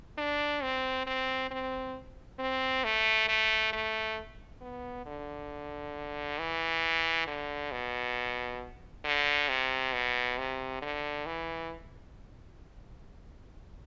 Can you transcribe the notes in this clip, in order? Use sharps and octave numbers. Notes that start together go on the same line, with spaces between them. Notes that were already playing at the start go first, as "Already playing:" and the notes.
D4
C4
C4
C4
C4
A3
A3
A3
B3
D3
E3
D3
B2
D3
C3
B2
C3
D3
E3